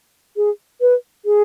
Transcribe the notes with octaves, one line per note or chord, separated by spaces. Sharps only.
G#4
B4
G#4